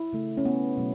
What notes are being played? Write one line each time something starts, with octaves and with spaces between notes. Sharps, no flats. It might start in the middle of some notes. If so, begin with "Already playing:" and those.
Already playing: E4
C#3 A3
C#4
B3
B2 F#3 A3